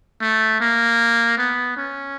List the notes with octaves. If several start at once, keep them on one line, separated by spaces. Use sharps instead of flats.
A3
A#3
B3
C#4